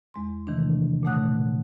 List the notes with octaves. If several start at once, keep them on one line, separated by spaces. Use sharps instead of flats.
E2 G#3 C6
C3 D#3 E3 A3 D4
A#2 C#3 A3 F#5 D#6 F#6